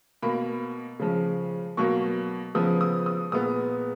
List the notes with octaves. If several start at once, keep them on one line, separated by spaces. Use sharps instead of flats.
B2 A#3 B5
C#3 F3 G#3
B2 F#3 A#3 C#6
C#3 F3 G#3 B3 D#6
D#6
D#6
A#2 G#3 B3 D#6